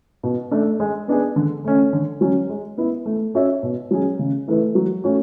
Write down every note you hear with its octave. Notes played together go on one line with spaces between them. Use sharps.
B2
A3 D4
G#3
B3 D4 G#4
D3
A3 C#4
D3
F#3 C#4
G#3
B3 E4
A3
C#4 F#4 C#5 E5
B2
F#3 C#4 G#4
C#3
E3 A3 E4 B4
F#3
A3 C#4 F#4 C#5